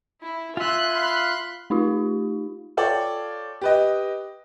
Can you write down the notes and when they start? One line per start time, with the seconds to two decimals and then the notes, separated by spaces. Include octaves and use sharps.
0.22 E4
0.57 F4 E5 G#5 C6 F#6
0.93 F5 B5 C6 F#6
1.70 A3 D#4 F4 G4
2.77 F4 A4 C#5 D5 G5
3.62 G4 B4 D#5